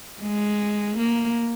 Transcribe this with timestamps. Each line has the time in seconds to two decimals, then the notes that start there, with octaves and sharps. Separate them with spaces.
0.22 G#3
0.98 A#3